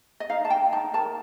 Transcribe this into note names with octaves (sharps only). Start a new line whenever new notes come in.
D#5
D#4 F5
A5
D#4 G5
D#4 A5
A#4 A5